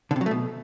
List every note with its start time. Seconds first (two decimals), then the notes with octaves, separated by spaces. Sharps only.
0.11 D3
0.16 C3
0.21 F#3
0.26 A3
0.31 B2